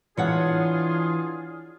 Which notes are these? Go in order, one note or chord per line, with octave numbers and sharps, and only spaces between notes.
E3 D4 F4 G#4 C#5 F#5